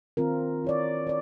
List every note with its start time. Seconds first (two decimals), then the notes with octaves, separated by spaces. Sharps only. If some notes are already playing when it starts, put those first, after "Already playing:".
0.17 D#3 C4 F4 A#4
0.64 E4 C#5 D5
1.07 C#5 D5